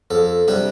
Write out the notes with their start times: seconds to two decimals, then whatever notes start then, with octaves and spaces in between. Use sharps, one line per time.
0.11 F2 A4
0.48 C3 G3 D4 G4